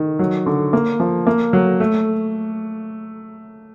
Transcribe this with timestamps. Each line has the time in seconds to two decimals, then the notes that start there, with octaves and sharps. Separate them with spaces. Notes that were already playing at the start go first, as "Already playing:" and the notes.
Already playing: D#3
0.19 F#3
0.46 D3
0.73 A#3
1.00 F3
1.27 A#3
1.53 F#3
1.80 A3